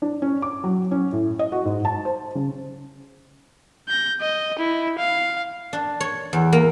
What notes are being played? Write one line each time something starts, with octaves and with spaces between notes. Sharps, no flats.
D4
C#4
D6
F#3
C#4
A2
D#5
F#4
G#2
A5
C5
C#3
G6 A#6
D#5
E4
F5
D4
C#5
E2
A#3